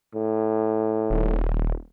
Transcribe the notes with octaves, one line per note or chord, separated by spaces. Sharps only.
A2
D#1